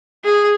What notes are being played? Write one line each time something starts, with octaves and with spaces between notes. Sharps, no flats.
G#4